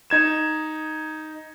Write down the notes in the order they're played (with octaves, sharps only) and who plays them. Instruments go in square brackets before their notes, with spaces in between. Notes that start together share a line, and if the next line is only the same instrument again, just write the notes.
[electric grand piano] D#4 G#6 E7